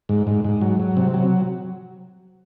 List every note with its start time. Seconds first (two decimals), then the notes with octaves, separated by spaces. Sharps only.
0.09 G#2
0.27 G#2
0.44 G#2
0.61 F#3
0.80 F#3
0.97 C3
1.14 F#3